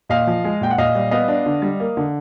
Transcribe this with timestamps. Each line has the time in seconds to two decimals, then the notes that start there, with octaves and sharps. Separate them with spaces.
0.09 A#2 D#5 F5
0.27 F3
0.44 G#3
0.61 A#2 G5
0.70 F#5
0.78 A#2 D#5 F5
0.95 G3
1.11 B3 D#5 F5
1.28 D4
1.46 D3
1.62 G3
1.80 A#3
1.97 D3